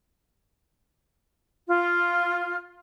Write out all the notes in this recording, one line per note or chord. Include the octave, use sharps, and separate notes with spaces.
F4